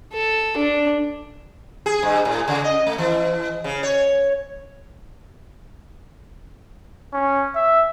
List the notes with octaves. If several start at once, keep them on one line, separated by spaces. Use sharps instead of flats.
A4
D4
G#4
G2
A2
C#3
D#5
A3
E3
C#3
C#5
C#4
E5